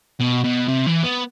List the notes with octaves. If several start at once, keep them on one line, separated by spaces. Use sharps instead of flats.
B2
B2
C3
E3
B3